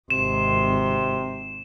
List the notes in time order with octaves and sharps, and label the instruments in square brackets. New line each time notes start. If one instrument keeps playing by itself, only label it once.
[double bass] G#1 [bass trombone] C3 [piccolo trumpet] C6 [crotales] E7